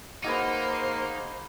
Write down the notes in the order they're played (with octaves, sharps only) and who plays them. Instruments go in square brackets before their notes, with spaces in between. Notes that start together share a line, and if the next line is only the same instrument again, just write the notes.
[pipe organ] A#3 [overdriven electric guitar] D#4 [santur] F#4 G#4 B4 [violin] C5 C6